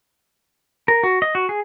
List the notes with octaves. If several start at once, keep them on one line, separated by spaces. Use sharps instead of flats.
A#4
F#4
D#5
F#4
G#4